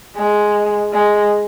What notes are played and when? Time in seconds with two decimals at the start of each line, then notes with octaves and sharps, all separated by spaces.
0.16 G#3
0.93 G#3